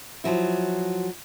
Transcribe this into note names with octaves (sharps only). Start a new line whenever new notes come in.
F3 F#3 E4